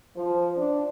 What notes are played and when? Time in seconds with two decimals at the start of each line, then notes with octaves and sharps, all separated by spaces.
0.16 F3
0.57 D4